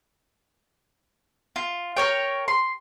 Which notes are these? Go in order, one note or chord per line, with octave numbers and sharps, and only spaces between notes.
F4
A#4 C#5 G5
C6